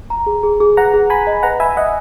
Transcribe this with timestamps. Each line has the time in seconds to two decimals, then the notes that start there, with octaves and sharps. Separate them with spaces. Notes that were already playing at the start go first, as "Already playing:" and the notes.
0.10 A#5
0.26 G#4
0.43 G#4
0.60 G#4
0.77 B4 F#5 A#5
0.93 G#4
1.10 G#4 G#5 B5
1.27 D#5
1.43 B4 F#5 A#5
1.60 E5 G#5 B5
1.77 D#5 E5 F#5